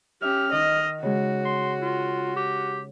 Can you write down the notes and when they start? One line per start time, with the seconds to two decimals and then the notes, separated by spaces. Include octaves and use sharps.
0.22 C#4 G4 E5 F6
0.52 D#3 D#5
1.02 C#3 G#3 F#4
1.45 C6
1.82 F4
2.36 G4